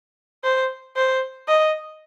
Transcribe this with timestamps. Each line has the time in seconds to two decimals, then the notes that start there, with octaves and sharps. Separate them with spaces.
0.44 C5
0.96 C5
1.48 D#5